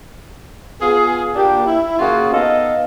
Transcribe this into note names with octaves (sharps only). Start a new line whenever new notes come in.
B3 F4 G#4
A#2 A#3 D4 G4
E4
C#3 A#3 F4 F#4 G#4
B3 D#4 A4 D#5 F5